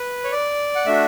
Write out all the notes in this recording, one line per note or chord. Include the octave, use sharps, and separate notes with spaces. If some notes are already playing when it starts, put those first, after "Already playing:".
Already playing: B4
C#5
D5
F#5
A3 D4 F#4 E5